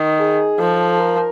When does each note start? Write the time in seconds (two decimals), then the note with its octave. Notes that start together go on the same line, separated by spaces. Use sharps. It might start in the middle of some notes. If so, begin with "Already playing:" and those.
Already playing: D#3
0.19 G#4
0.59 F3 A4
1.00 A#4